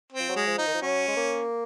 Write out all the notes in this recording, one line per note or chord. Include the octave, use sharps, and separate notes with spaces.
C4
F3
F#3
G#3
F3
D#4
D#3
F3
F#3 C#4
G#3
A#3